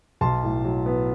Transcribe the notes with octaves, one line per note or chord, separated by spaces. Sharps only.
B1 A5 C6
A2
F#3
B3